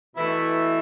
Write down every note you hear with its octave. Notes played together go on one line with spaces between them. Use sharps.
B2 E3 A3 E4